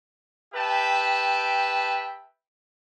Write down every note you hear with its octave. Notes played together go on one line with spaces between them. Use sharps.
G4 B4 E5 G5 A5